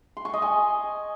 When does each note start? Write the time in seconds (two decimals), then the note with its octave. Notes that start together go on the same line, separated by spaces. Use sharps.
0.17 C6
0.25 C#6
0.34 D#5
0.42 G#5